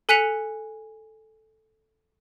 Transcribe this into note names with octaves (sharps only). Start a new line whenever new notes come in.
A4 G#5 F#6 B6 C#7 F7